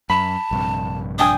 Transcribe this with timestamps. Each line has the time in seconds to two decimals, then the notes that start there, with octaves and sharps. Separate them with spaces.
0.10 F#2 A5 B5
0.51 A#1 G2 C3
1.19 D4 G5 G#5 D#6